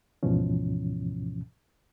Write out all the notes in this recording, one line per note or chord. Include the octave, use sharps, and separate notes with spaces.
D2 G#2 B2 E3 F3 C#4